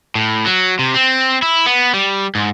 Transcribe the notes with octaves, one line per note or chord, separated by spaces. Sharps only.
A2
F#3
C3
C4
E4
B3
G3
G#2